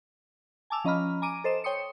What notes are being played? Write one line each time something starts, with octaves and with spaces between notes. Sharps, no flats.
G#5 A5 D6 E6 F7
F3 C#4 D#5 A#5 B5 F6
G#5 A#5 D6 D7 D#7
A4 C5 D#5 E7
C#5 G5 C6 D#6 C#7